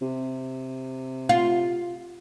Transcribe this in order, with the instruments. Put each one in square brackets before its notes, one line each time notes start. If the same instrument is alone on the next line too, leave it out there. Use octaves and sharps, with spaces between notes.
[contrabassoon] C3
[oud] F4